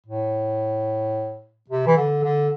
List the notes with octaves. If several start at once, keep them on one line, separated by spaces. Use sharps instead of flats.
A2
C3
E3
D3
D3